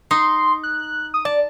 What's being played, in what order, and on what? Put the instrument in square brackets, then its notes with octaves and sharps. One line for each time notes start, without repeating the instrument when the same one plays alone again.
[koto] D#4 [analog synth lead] C6
[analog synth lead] F#6
D#6
[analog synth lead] D5 [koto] A5